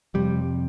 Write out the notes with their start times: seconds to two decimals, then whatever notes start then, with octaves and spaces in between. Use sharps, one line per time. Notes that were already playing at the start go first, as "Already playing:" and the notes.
0.14 F2 C3 G3